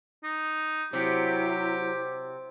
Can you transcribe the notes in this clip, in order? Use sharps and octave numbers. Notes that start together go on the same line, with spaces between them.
D#4
C3 F#3 E4 G4